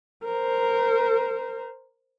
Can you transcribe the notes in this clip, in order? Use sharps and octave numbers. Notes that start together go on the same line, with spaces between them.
A#4 C5